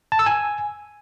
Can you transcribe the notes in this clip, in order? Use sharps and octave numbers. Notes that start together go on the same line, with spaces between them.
A5
E6
G#5